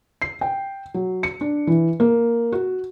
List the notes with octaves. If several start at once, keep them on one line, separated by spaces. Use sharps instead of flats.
C7
G5
F#3
C#7
D4
E3
A#3
F#4